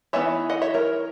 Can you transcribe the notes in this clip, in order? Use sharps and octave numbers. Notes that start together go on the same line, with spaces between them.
E3 B3 D#4 C#5 E5
D#5 F#5
C#5 E5
A#4 C#5